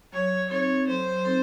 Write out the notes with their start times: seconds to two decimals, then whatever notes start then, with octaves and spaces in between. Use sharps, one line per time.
0.13 F#3 C#5
0.50 C4 D#4 A4 C#5
0.87 F#3 C5
1.25 C4 D#4 A4